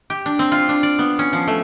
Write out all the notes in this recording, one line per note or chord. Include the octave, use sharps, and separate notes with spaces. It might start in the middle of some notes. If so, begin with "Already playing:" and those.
G4
D4
C4
F4
D4
D5
B3
C#4
F3
A3